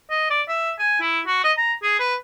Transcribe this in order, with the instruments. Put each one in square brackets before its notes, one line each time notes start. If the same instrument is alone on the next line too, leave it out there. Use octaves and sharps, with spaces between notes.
[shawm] D#5
D5
E5
G#5
E4
F#4
D#5
A#5
G#4
B4